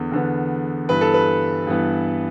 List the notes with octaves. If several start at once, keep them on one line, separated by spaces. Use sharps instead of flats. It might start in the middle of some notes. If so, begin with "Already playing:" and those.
Already playing: E2 D3 B3
E2 D3 B3
G2 E3 B3 B4
A4
B4
G2 E3 B3